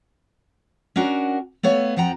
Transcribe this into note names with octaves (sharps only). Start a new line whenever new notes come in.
C#4 D4 F#4 A#4
A3 B3 C#5 F5
F2 F3 F#5 G5 A#5